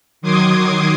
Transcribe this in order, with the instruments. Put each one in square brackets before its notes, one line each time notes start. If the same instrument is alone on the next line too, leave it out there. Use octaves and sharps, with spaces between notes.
[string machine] D#3 F#3 C6 D6 D#6 G#6